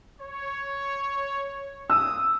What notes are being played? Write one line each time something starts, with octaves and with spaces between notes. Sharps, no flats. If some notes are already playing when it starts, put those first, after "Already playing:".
C#5
A#3 D#6 E6